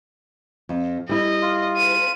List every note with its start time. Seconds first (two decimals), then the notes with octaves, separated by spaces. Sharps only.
0.69 F2
1.09 G3 E4 D#5
1.42 F4
1.77 D#7